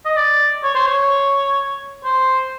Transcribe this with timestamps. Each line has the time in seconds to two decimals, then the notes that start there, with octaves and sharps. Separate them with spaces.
0.05 D#5
0.16 D5
0.64 C#5
0.75 C5
0.86 C#5
2.05 C5